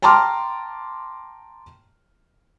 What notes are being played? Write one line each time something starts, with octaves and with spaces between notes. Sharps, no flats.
G5 A5 A#5 C6 D6 F6